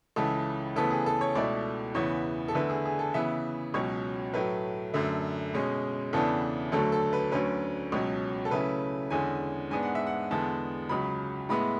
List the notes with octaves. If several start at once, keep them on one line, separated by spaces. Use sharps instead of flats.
C#2 C#3 E3 A4
D2 C#3 E3 B3 A4
G#4
A4
C#5
C#2 B2 A3 E4 D5
E2 C#3 E3 B3 C#5
A4
E2 D3 A3 E4 B4
G#4
G#4
A4
C#3 E3 B3 E5
C#2 B2 F#3 C#4 C#5
A2 F#3 A3 B4
F#2 D3 A3
B2 G#3 C#4
E2 C#3 E3 B3 D4 A4
D2 D3 F#3 A3 A4
A4
B4
D2 D3 F#3 C#4 B4
C#2 B2 F#3 C#4
A4
C#3 F#3 A3 C#4 E4 B4
E2 D3 G#3 C#4 G#5
G#2 G#3 B3 D4 G#5
F#5
E5
F#5
E2 D3 G#3 B3 A5
C#2 C#3 F#3 B5
A2 G#3 B3 E4 B5